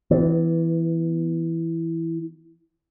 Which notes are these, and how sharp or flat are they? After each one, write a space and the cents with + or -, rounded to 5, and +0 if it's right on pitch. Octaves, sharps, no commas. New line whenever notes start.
E3 +0 B3 +25